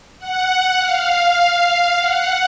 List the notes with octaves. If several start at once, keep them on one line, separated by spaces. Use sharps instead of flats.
F#5
F5
F#5